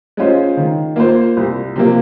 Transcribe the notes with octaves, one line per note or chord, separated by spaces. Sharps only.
G#3 C#4 F4 C5
D#3
A#3 F4 C5
C2
C3 F3 A#3